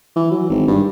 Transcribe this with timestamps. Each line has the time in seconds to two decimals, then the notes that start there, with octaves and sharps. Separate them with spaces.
0.16 E3
0.31 F#3
0.50 G#1
0.68 G2